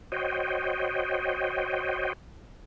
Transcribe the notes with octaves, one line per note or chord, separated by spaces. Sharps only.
F#4 C5 C#5 D#5 G5